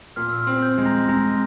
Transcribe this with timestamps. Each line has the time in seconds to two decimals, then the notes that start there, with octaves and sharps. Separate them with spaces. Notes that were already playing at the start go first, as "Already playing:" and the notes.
0.16 A#2 F6
0.29 E6
0.40 F6
0.47 C4
0.62 G6
0.78 G#3
0.86 A#5 A#6
1.08 G#3 A#5 A#6